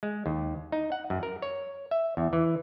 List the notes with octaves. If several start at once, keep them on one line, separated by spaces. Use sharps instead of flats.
G#3
D#2
D#4
F#5
F#2
A#4
C#5
E5
E2
E3